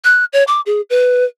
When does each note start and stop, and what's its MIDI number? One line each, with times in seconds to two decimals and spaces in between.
0.04 0.25 90
0.33 0.44 73
0.47 0.61 86
0.66 0.81 68
0.90 1.25 71